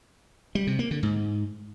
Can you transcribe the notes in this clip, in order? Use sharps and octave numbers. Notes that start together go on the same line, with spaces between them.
G3
C3
A#3
D3
G#2